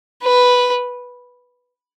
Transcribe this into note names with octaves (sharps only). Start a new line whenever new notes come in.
B4